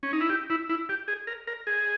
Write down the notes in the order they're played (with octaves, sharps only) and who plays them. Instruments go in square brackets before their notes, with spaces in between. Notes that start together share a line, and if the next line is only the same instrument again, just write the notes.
[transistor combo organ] C#4
D#4
E4
G4
E4
E4
G4
G#4
A#4
A#4
G#4